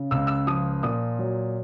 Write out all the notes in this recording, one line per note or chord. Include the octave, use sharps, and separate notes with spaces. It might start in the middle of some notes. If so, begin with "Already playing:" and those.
Already playing: C#3
C#2 E6
E6
F3 D#6
A#2 D#6
F#3